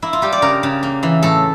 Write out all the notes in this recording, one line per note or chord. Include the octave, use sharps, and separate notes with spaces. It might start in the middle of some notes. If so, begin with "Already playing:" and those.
A#3 E4
F4
G3 G4
D5
C#3 A#4
C#3
A#3
E3
A2 A4